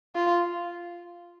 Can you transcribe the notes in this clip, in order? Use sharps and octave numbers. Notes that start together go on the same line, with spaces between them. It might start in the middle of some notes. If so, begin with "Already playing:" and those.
F4